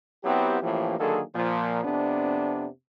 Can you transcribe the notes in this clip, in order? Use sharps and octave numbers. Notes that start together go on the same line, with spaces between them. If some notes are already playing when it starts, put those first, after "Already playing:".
F#3 B3 C4 E4 G4
A1 A2 E3 F3 A#3 G4
D3 D#3 F#3 A#3 G#4 A4
A#2 F3
F2 C3 B3 D4